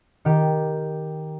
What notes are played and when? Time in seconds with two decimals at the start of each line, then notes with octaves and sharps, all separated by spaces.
0.25 D#3 G4 G5